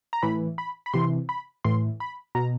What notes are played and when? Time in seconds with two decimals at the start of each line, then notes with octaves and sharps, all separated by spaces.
0.13 A#5
0.23 A2 E3 B5
0.58 B5
0.86 B5
0.94 C3 E3 C6
1.29 B5
1.64 A2 E3 C6
2.00 B5
2.35 B2 A#5